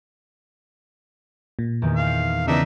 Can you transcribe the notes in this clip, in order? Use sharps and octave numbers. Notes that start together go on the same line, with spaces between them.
A#2
E2 D#3
F5
C#3 E3 B3 D4 D#4 E5